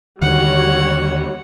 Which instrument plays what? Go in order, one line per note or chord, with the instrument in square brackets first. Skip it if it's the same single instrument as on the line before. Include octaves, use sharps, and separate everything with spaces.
[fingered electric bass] D#2 D3 D#3 [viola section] G3 F#4 C#5 [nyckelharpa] F#5